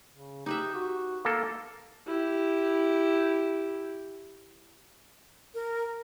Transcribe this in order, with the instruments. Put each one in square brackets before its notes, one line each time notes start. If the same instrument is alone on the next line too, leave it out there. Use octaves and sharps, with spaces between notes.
[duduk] C#3
[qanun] D#4 B4 E5 [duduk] G4
[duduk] F#4
[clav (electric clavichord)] A#3 A4
[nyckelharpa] E4 G4
[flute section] A#4